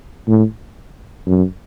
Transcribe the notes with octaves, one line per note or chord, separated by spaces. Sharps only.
A2
F#2